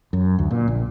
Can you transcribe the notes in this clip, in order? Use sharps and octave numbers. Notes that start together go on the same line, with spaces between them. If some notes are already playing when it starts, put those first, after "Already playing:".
F#2
D2
A#2
A#1